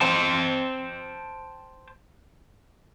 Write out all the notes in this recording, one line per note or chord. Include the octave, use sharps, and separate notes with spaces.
C5 G5 A5